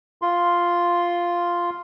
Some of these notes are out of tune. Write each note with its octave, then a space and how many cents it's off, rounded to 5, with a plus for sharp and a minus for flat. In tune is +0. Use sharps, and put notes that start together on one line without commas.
F4 +0 C6 +0